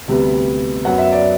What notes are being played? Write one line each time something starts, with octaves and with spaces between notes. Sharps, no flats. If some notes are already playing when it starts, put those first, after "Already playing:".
D2 C3 G3 B3
F#2 F#3 B3 F#5
E5
D5